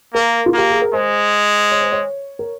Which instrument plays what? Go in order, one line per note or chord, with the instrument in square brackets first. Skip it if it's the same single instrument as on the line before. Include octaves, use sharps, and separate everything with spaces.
[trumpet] A#3 [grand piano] A#4
[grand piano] F4
[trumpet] A#3 [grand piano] G4
[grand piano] G#4
A#4
[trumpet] G#3 [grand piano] C5
[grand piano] C#5
C5
C#5
A#4